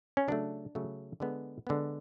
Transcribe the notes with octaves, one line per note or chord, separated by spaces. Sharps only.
C#4
C#3 F#3 A3 D4
C#3 F#3 A3
D3 G#3 B3
D3 G#3 B3